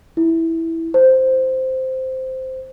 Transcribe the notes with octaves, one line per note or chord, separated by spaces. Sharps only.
E4
C5